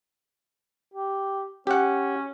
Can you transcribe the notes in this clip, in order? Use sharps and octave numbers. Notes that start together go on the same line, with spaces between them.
G4
C#4 G4 F#5